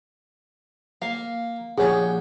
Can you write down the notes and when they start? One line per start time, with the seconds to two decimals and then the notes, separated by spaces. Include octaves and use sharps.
1.02 A#3 F5
1.78 A#1 G4 G#4 C#5 F#5